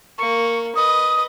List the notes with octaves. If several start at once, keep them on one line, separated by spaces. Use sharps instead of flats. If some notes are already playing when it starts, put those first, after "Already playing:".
A#3 C#6
B4 D#5 D#6